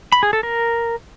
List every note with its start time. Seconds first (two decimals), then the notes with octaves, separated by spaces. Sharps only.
0.12 B5
0.23 G#4
0.33 A4
0.43 A#4